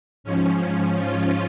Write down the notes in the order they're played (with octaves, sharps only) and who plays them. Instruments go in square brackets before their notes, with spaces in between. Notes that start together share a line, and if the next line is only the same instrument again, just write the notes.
[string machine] G#2 F3 C#4
C#4 F4